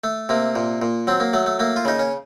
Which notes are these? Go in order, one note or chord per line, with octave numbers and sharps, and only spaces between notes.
A3
C3 A#3
A#2
A#2
F#3 C4
A#3
F#3 A3
A3
A3 A#3
F4
C#3 D#4
C#4